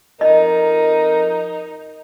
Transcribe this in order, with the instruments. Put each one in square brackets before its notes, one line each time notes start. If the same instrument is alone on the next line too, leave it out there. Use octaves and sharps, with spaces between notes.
[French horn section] F2 A#4 [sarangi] D#4 [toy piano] D#5